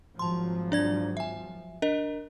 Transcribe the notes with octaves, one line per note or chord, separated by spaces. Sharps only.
G#1 F3 F#3 A5 C6
D4 D5 G#6
E5 G#5
D4 A#4 D#5